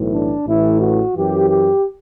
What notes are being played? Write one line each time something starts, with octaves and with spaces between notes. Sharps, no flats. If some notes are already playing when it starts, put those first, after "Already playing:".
Already playing: B1 A2 E3
D4
A1 A2 E3 E4
F#4
F#2 E3 G4
G4